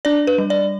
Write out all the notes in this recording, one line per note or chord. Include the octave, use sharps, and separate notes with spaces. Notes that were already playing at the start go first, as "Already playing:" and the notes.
D4 D5
B4
G3
D5